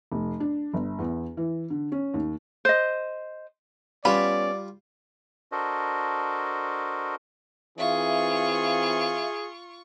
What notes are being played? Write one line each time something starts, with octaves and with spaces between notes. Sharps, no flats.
F1
D4
G1
E2
E3
D3
C#4
D#2
C5 D#5
G3 B3 C#4 F4 D5 B5
D4 F#4 A4 A#4 C5 D#5
E3 C4 F4 G#4 E5 F5 C#6